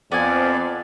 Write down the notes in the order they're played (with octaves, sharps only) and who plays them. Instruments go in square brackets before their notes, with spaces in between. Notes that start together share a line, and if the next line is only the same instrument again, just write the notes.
[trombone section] F2 [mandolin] B3 C4 G#5 [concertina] D5